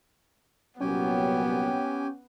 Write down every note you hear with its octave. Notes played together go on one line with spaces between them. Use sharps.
C2 A#2 F#3 B3 C#4 G4 G5 G#5